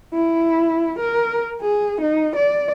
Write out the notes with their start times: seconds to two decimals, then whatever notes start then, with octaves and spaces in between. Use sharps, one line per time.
0.13 E4
0.99 A#4
1.61 G#4
2.01 D#4
2.36 D5